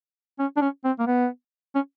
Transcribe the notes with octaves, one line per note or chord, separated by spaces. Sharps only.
C#4
D4
C#4
C4
A#3
B3
C#4